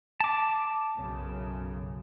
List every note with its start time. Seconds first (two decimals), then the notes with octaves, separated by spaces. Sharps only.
0.20 A5 D6
0.97 B1 F#2 C#3